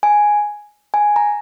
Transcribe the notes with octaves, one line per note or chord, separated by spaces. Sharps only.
G#5
G#5
A#5